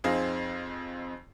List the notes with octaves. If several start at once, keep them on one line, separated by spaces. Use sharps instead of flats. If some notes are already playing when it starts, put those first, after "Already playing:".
F2 C4 D#4 G#4 F5